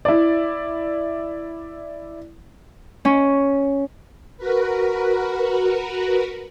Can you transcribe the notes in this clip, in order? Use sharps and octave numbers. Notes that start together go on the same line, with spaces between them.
E4 D5
C#4
F#4 A#4 B4